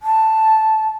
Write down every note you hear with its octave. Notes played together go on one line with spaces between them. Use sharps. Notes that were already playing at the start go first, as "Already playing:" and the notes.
A5